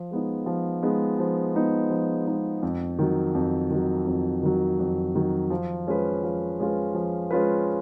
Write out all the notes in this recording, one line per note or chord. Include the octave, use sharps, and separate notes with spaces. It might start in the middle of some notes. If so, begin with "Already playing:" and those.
Already playing: F3
G#3 B3 D#4
F3
G#3 B3 D#4
F3
G#3 B3 D#4
F3
G#3 B3 D#4
F2
D#3 F#3
F2
D#3 F#3
F2
D#3 F#3
F2
D#3 F#3
F3
G#3 C#4 F4 B4
F3
G#3 C#4 F4 B4
F3
G#3 C#4 F4 B4